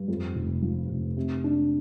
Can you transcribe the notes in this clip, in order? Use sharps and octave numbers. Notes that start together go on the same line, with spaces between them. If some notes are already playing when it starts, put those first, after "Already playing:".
Already playing: G2
F2
F1
F3
F1
C3
D4